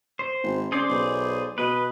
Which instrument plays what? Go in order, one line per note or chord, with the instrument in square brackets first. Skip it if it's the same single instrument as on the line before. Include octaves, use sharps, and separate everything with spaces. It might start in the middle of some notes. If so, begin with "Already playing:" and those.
[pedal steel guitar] C5
[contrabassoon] G#1
[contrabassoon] C#3 [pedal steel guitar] G#4 C5 D5
[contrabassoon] B1
[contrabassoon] B2 [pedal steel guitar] B4 D#5